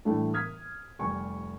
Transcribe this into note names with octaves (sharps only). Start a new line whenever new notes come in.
A2 E3 G3 A3 D4
D#6 F6 G#6 B6
F1 G3 G#5 C#6